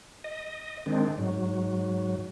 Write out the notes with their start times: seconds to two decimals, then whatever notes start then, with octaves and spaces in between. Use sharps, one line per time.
0.24 D#5
0.86 D#3 G#3 C4 D4
1.18 G#2 F#3